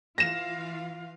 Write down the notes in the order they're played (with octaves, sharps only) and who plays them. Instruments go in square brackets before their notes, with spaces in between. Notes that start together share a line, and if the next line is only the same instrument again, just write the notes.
[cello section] E3 F4 F5 [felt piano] A#6 E7